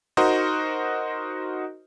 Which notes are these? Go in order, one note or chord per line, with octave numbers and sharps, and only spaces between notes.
D#4 F#4 A#4 C5 D#5